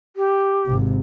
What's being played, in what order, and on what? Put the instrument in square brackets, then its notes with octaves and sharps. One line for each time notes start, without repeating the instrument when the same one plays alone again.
[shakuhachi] G4
[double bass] G#1 C3